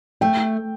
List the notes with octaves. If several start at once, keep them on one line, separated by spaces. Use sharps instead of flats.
A3 G5